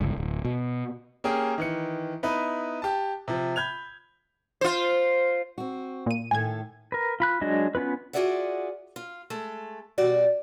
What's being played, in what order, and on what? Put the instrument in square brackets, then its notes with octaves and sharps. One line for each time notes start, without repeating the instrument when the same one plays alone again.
[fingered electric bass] G1 C#2
D1
B2
[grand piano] A#3 C#4 G4 G#4 G5
D#3 E3 C#7
B3 D#4 E4 B4
G4 A5
C3 F3
B5 G6 G#6 F7
[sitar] F4 C5
[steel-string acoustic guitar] C4 F#4
[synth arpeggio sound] A#2 D#7
[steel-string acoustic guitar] A2 D#3 A4 [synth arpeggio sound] G#5 G#6
[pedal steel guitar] A#4 B4
F4 B5 F#6
F#3 G#3 D4 F#4 D#5
B3 C#4 F4 B4
[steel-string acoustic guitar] F4 F#4 G#4 D5 E5 F#5
F4
G#3 A3 A4
B2 G3 F#4 D5